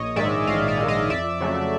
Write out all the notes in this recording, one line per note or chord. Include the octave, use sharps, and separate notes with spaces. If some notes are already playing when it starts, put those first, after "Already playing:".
Already playing: A#1 C#5 D#5
G#2 D#3 G#3 D5 E5
A#1 D#5 F5
D5 E5
G#2 D#3 G#3
D#5 F5
F2 D5 E5
C#3 F#3 A3